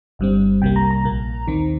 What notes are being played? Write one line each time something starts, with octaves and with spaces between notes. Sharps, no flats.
G1 G2 G3 C4
C2 C3 G3 A#3 G5
A#5
A#5
A#1 A#2 A#3
D#2 D#3 C4